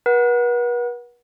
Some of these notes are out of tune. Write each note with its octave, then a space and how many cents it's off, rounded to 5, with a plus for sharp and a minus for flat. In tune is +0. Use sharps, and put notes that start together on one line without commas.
B4 -40 F#5 +0